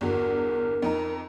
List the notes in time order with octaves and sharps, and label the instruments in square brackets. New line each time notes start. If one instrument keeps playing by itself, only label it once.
[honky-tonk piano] G1 E2 F#4 [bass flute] A#4
[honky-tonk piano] F2 D#4 A#5